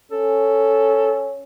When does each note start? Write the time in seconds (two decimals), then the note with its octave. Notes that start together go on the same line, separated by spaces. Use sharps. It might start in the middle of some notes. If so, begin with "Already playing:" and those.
0.12 C#4 A4